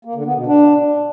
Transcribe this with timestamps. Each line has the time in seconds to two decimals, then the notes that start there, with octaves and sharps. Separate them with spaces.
0.05 A#3
0.15 D3
0.26 B3
0.36 B2
0.46 D4